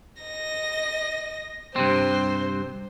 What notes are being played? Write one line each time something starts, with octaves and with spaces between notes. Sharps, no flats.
D#5 A#6
G2 C3 C4 C5